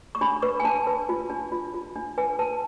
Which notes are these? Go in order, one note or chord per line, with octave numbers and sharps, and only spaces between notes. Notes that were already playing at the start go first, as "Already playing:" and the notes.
C#6
D4 B5
B4 C#6
G#5
D4 A5
B4
F4
D4
F4
F4
D4
B4 G#5
B4 A5